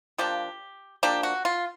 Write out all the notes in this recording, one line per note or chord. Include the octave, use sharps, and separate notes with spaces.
F3 A#3 D4 G4
F3 A#3 D4 G4
F#4
F4